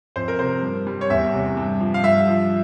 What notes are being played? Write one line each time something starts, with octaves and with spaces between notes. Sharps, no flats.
F2 C5
A#4
C3 C5
G2
G3
C#5
E2 E5
C3
G2
F3
F5
G2 E5
F3